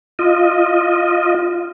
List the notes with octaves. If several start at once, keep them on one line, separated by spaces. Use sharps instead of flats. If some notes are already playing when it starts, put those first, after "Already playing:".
F4 D#5